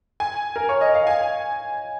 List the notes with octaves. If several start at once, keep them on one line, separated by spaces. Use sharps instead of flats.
G#5
A#4
C#5
D#5
F5
G#5